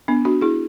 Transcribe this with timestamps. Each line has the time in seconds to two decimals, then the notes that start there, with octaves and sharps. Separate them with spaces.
0.08 B3 D4
0.25 D4 F#4
0.41 E4 G#4